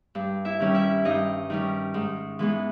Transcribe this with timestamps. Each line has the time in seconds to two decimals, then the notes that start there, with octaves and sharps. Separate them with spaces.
0.15 G2
0.45 E4 E5
0.60 D#3 G3 C#4
0.74 E4 E5
1.05 G2 D#4 D#5
1.50 D#3 G3 C#4
1.94 G#2
2.39 E3 G#3 B3